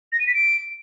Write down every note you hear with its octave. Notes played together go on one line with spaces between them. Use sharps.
A#6
D#7
B6
D7